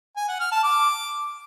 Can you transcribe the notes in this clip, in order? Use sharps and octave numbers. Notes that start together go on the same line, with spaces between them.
G#5
F#5
F6
A5
D6